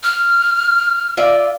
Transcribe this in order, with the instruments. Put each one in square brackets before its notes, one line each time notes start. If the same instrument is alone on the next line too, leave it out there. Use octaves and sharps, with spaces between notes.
[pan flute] F6
[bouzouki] F4 D5 E5